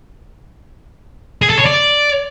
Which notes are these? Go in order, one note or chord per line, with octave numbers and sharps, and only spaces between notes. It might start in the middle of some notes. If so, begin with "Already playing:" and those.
G#4
A4
C#5
D5